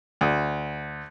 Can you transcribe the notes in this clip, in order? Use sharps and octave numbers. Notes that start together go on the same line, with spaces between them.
D2